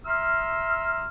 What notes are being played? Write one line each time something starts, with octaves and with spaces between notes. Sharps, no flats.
E5 A#5 C6 E6 F6